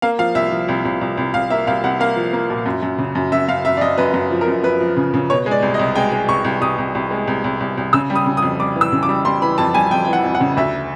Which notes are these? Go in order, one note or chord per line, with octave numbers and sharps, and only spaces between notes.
A#3 F5
F3 F5
C2 E5
F3
C2
C2
C2
C2
C2 F5
A#3 E5
C2 F5
C2 F#5
A#3 F5
F3
A#3
A#2
F#2
F#2
C#3
F#2
F#2 E5
F#2 F5
F#2 E5
D5
F#2 D#5
F#2 B4
F#2
F3
A#4
F#2
F#2 B4
F3
C#3
C#3
B2 C#5
G#3
D5
C2
D#5
C2
G#3 G5
G#3
C2 C#6
C2
C2 D#6
C2
C2
G#3
C2
C2
C2
C2
C#3 E6
G3
D#6
C#3
D#6
F2
G3 D6
E3
E6
C#3
D6
G3
G3 C6
E3 B5
F2 A5
G3 G#5
F2 G5
E3 G5
F#5
F2
F#5
C#3
D2 E5